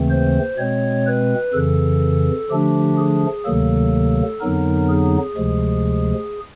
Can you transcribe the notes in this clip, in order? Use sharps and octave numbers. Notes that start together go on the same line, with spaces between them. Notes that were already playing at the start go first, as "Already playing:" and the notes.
Already playing: D#2 C#3 E3 A3 C4
C5
B2 G#3 C4 C#5
B4
F2 C#3 E3 A4
D3 F3 A3 D4 G4
G#4
D2 C3 D#3 F#3 A#3 A4
F2 D3 F#3 B3 D#4 A#4
G#4
D2 C3 F3 G#3